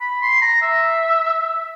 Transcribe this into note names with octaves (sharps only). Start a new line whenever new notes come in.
B5
C6
A#5
E5